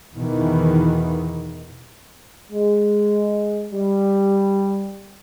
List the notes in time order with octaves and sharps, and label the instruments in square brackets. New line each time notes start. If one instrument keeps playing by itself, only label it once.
[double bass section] E2 B2 D#3 E3
[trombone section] G#3
G3